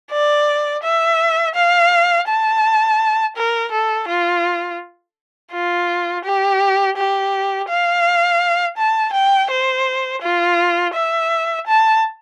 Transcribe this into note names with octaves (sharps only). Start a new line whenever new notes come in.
D5
E5
F5
A5
A#4
A4
F4
F4
G4
G4
F5
A5
G5
C5
F4
E5
A5